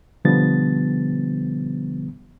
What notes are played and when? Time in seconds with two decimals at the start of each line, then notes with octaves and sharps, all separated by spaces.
0.25 B2 D3 F3 G3 B3 A6